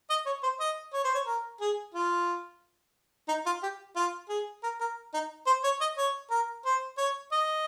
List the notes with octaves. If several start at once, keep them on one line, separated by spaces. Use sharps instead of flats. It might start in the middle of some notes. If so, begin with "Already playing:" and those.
D#5
C#5
C5
D#5
C#5
C5
C#5
A#4
G#4
F4
D#4
F4
G4
F4
G#4
A#4
A#4
D#4
C5
C#5
D#5
C#5
A#4
C5
C#5
D#5